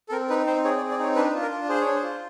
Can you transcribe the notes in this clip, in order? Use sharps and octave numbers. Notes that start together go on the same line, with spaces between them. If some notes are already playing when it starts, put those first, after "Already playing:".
A4
C4 A#4
D#4 B4
C4 C5
G#4 C#5
D5
C4
D5
D#4 C#5
D4 B4
B4
F4
A#4
D4
G#4 C5
D4 C#5
C5
F4